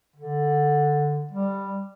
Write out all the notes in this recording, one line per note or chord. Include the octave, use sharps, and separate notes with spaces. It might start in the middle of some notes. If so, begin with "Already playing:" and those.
D3
G3